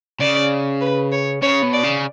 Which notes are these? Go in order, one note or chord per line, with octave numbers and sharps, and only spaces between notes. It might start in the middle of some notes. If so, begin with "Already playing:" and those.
C#3 D5
B4
C#5
C#3 C#5
B2
D5
C#3